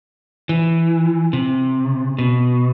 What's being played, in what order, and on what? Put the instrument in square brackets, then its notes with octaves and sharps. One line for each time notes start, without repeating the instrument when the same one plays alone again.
[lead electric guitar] E3
C3
B2